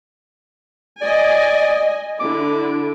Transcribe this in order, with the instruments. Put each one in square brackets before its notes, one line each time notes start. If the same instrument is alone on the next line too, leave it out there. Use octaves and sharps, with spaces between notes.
[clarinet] D5 [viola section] D#5 G#5
[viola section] D3 E4 [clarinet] D6